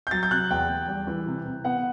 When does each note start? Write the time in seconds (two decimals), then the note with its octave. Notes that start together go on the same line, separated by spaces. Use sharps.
0.07 G6
0.11 F#3 A6
0.23 G6
0.31 C3 F#6
0.50 E2 G5
0.69 E2
0.88 G3
1.07 E3
1.27 C3
1.45 C3
1.64 B3 F#5